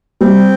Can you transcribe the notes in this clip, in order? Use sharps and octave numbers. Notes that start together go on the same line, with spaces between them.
G3 C4